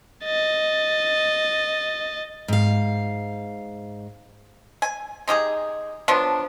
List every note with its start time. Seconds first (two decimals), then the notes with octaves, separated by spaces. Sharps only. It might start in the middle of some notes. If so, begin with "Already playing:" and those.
0.25 D#5 A6
2.48 G#2 F5
4.82 G#5
5.27 G#3 D#4 G4 G#4
6.08 F3 F#3 B3 D4